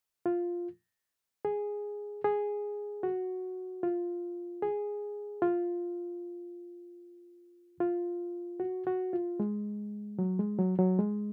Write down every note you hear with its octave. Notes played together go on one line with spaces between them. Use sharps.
F4
G#4
G#4
F#4
F4
G#4
F4
F4
F#4
F#4
F4
G#3
F#3
G#3
F#3
F#3
G#3